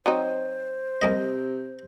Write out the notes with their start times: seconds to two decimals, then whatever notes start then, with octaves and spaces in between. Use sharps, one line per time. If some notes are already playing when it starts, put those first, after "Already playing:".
0.06 F#3 C4 D#4 C5
1.02 C2 C3 A#3 D#5